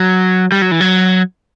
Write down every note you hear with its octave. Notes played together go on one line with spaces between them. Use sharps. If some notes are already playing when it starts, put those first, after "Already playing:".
Already playing: F#3
G3
F#3
E3
F#3